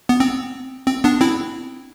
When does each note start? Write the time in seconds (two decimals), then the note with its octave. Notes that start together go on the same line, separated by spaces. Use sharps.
0.09 B3
0.20 C4
0.87 C4
1.04 B3 D4
1.21 C4 E4